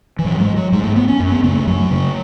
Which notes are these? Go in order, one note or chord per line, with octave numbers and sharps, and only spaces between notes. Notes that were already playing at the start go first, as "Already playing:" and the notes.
E3
G#2 F#3
G#3
F#3
G#2 G#3
A3
B3
C#4
F#2
B3
C#3 A3
A3
F#2 F#3
C#3